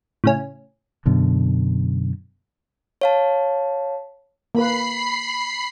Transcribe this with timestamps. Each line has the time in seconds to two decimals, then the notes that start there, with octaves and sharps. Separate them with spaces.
0.24 A2 C#3 C#4
1.06 F#2 B2 D3
3.01 C#5 F5 A5
4.55 A#3 B4 B5 C7